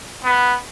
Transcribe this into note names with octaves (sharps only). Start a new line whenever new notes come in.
B3